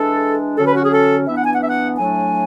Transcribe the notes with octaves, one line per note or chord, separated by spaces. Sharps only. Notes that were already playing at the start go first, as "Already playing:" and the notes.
Already playing: E3 G#3 D4 A4
D3 F#3 C#4 A4
B4
F#4
G#4
A4
E3 B3 D4 E5
F#5
G#5
F#5
E5
F#5
A2 F#3 A3 D4 G#5